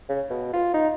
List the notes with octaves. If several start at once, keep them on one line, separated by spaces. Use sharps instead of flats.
C#3
B2
F4
D#4